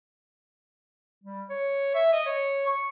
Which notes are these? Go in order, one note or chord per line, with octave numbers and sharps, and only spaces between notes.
G3
C#5
E5
D#5
C#5
C#6